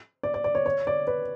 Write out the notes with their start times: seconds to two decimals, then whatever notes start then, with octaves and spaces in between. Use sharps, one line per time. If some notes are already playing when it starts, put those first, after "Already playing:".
0.23 D5
0.34 D5
0.44 D5
0.55 C#5
0.66 C#5
0.87 D5
1.07 B4